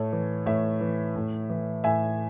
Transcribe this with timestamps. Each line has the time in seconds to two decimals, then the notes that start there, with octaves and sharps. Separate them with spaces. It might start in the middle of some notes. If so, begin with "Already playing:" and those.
Already playing: A2 A4 C#5
0.13 E3
0.46 A2 C#5 E5
0.81 E3
1.16 A2
1.50 E3
1.84 A2 E5 G#5